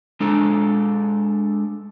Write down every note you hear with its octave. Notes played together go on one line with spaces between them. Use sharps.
G#3 D4 A4